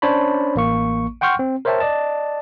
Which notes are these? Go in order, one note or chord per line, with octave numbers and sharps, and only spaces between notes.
C#4 D4 C5 C#5 A5 B5
A1 A#3 C#6
F#5 G5 C6 C#6 F6 G6
C4
A#4 C5 C#5 E5 G5 A5
D5 D#5 A5